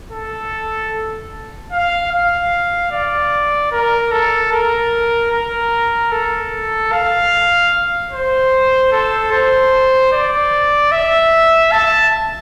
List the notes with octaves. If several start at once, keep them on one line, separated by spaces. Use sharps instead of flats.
A4
F5
F5
D5
A#4
A4
A#4
A#4
A4
F5
C5
A4
C5
D5
E5
A5